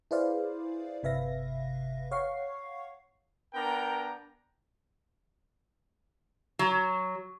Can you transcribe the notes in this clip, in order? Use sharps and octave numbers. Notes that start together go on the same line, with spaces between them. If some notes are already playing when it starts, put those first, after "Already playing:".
E4 G#4 B4 C5 D5 F5
G1 C3 B4 E5 F5 A#6
C#5 F5 F#5 C#6 C7
B3 D4 A#4 G5 A#5
F#3